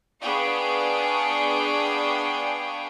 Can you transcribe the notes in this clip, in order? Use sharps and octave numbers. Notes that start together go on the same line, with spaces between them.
B3 D4 G#4 F5 G5 C#6